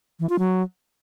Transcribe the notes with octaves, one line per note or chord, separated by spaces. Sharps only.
E3
F4
F#3